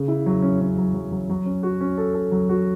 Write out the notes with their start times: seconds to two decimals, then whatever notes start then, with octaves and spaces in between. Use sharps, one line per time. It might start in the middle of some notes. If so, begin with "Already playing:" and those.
Already playing: C#3
0.08 E4
0.26 F#3
0.42 C#4
0.61 C#4
0.78 F#3
0.94 F#3
1.12 F#3
1.29 F#3
1.46 C#4
1.63 F#4
1.81 C#4
1.98 A4
2.14 A4
2.32 F#3
2.49 F#4